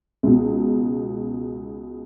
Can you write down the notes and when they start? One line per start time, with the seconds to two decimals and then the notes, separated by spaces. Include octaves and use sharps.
0.23 C#2 B2